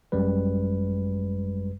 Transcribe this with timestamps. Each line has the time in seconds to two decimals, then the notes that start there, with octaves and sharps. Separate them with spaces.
0.12 G#1 F#2 G3 G#3 B4